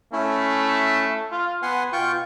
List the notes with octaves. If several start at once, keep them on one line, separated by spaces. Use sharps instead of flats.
A3 C#4 E4
F4
B3 F#5 G#5 C6
B2 F4 G5 C#6